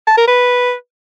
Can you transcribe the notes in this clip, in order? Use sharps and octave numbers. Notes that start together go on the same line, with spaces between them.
A5
A#4
B4